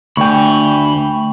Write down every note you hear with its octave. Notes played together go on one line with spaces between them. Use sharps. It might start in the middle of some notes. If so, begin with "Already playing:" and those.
D2 A3 G5 G#5 B5 C#6